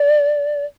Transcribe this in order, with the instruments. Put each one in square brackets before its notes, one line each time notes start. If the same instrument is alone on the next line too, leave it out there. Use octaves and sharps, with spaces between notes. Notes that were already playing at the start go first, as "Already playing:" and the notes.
Already playing: [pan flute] D5